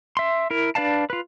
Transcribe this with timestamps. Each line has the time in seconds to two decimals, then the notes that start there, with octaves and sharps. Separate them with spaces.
0.17 E5 C6
0.51 E4 A#4
0.75 D4 B4 D5 F5 A5
1.10 F4 B4